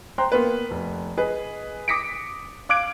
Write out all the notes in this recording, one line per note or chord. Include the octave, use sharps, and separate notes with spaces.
C5 G5 A#5 C6 F#6
A#3 B3 B4
F1
G#4 B4 D#5
D6 D#6 A#6 B6 C#7 D7
F5 D6 F#6 G#6 D7